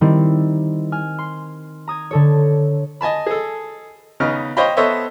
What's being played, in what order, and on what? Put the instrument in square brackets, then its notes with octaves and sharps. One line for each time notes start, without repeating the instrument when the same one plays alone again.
[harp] D#3 G3 C4 E4
G#5 F6
C6
A#5 D#6 G#6
D3 A4 C#5
[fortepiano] D#5 G#5 A5 B5
G#4 A4
C#3 B3 D#4 F6
C5 C#5 D#5 F5 G5 B5
B3 A4 C5 C#5 D#5 E5